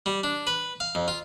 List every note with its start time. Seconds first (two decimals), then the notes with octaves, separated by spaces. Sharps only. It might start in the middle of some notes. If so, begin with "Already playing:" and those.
0.06 G3
0.24 D4
0.47 B4
0.80 F5
0.95 F2
1.08 F4